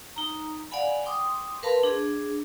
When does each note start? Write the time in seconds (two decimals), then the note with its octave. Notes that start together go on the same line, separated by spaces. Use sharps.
0.16 D#4 A#5
0.71 D5 F5 F#5 G#5 B5
1.05 G5 C6 D6 D#6
1.63 A#4 B4 F5 A5 B5 C6
1.83 D4 G#4